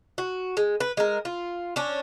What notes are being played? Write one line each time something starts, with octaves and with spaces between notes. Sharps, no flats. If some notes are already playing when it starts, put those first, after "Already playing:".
F#4
G#3
B4
G#3 A#4
F4
C#4 D4